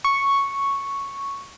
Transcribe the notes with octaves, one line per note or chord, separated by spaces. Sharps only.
C#6